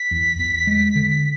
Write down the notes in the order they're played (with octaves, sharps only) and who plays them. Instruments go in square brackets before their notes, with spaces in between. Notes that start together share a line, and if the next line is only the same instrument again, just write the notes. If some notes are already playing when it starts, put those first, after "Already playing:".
Already playing: [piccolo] B6
[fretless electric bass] E2
E2
G#3
D3